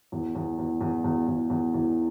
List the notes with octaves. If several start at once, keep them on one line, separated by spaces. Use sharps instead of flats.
E2
E2
E2
E2
E2
E2
E2
E2